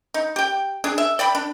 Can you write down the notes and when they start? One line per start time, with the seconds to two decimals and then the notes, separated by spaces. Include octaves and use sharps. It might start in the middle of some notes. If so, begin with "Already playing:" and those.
0.14 D#4
0.36 G4 G5
0.84 D4 G#4
0.98 E5
1.19 D5 G5 B5
1.35 D4